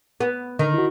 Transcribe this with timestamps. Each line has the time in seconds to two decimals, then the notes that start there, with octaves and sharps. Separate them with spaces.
0.20 B3
0.59 D3 D#3
0.74 E4 F#4